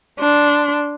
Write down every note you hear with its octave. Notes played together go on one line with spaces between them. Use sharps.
D4 C6